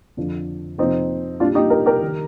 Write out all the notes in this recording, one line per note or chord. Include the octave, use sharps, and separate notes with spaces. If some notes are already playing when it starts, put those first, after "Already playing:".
F2 D3 F3
F2 C3 F3 C4 D#4
A#2 G3 D4 F4
D#4 G4
G4 A#4
G4 A#4
D#3 G3